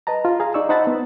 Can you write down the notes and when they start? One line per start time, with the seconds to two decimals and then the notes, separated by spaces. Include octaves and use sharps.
0.07 B4 D#5 A5 A#5
0.25 F4
0.40 G#4 F5 A#5
0.54 D#4 D5 C#6 E6
0.69 D#4 C5 F#5 A5 B5 A6
0.87 B3